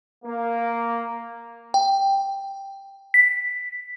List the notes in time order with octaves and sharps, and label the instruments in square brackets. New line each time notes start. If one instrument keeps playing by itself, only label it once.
[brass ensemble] A#3
[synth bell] G5
B6